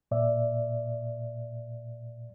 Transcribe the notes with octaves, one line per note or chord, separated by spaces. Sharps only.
A#2 D5 E5